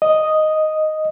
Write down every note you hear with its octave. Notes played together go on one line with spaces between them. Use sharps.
D#5